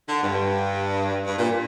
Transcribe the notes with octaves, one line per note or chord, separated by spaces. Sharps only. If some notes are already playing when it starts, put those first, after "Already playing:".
D3
G2
G2
A#2